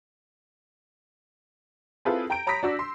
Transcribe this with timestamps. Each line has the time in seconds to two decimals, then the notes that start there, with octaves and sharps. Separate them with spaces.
2.05 C4 E4 F4 G#4 A4 B4
2.30 G5 A#5 G6 D7
2.47 C#5 A#5 B5 D#6 A#6 B6
2.63 D4 F#4 E6
2.79 C6